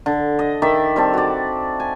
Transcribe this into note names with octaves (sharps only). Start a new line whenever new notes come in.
D3
D#5
D#3 D5 E5
G3 C4 A4
F#4 D5
G#5